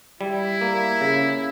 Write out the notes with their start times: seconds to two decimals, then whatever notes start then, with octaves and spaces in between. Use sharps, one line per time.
0.20 G3 E4
0.61 A#3
1.01 C#3